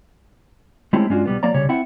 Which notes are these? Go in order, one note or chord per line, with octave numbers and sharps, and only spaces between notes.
G#3 A3 C4 C#4 E4 G4
G2 G#3 C#4 D4 F4 F#4
B1 G3 B3
F3 A#3 C#5 D5 A#5
C2 C#3 G3 C#5
C4 E4 E5 F#5